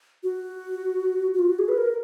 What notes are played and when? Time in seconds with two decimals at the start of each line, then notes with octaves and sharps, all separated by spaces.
0.24 F#4
1.34 F#4
1.39 F4
1.49 F#4
1.59 G#4
1.69 B4
1.78 A#4